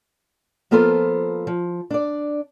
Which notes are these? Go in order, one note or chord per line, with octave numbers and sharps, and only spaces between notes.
F3 A#3 B3 F4 A4 C5
F3
D4 D5